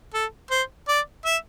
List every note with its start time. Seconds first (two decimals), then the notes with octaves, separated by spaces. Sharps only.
0.14 A4
0.51 C5
0.88 D5
1.25 E5